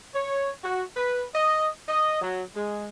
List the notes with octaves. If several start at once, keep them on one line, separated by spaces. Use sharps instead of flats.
C#5
F#4
B4
D#5
D#5
F#3
G#3